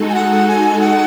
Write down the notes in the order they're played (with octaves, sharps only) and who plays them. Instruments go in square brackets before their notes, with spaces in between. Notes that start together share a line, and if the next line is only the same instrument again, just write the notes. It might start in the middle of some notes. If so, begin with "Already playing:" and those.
Already playing: [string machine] G#3 D#4 F#4 A4
[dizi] G#5
F#5
G#5
F#5